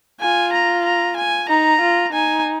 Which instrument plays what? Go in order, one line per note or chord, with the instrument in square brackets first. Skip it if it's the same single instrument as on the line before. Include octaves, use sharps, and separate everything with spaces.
[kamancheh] F4 [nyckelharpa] G#5
[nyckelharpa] A#5
A#5
G#5
[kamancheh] D#4 [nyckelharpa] A#5
[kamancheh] F4
[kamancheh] D#4 [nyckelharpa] G#5